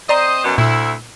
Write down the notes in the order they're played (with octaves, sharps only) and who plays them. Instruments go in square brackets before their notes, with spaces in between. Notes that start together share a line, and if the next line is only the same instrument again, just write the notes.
[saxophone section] C4 C5 D#5 [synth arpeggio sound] D5 A#5 C6
[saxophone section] F#2 B2
[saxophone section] D2 E4 [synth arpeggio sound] A#2